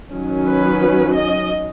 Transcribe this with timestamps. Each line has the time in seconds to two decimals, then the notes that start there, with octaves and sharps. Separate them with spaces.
0.12 D#3 F#3 C#4
0.46 B4
1.15 D#5